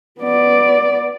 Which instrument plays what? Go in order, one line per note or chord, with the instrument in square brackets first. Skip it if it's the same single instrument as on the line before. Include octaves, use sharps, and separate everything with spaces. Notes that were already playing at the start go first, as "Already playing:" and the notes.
[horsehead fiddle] B3 D5